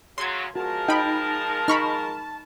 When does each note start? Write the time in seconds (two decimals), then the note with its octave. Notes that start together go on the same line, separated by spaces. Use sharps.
0.18 C#3 F#3 C6 G#6
0.56 F3 G#3 F#4 A#4 A5
0.88 D#4 G5 B5
1.68 D#4 B5 C#6 F6